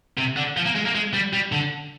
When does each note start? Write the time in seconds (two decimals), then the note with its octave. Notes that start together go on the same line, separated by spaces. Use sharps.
0.18 C3
0.37 D3
0.57 F3
0.66 A#3
0.75 G#3
0.85 A#3
0.95 G#3
1.13 G3
1.33 G3
1.52 D3